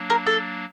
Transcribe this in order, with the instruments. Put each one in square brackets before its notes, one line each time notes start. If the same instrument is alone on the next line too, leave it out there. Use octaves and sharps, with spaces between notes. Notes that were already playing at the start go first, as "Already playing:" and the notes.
Already playing: [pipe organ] F#3 A#3 D4
[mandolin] A#4
A4